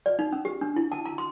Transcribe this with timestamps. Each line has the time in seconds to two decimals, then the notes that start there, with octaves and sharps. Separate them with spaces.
0.06 D5
0.19 D#4
0.33 C#4
0.45 G4
0.61 D4
0.76 E4
0.92 A5
1.06 A#5
1.18 C6